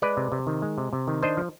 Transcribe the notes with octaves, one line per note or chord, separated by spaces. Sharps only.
G#3 B4 D5
C3
C3
D#3
G#3
C3
C3
D#3
D4 C5 D#5
F3